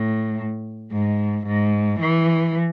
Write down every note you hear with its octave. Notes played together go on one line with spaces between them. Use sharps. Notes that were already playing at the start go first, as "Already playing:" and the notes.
Already playing: A2
G#2
G#2
E3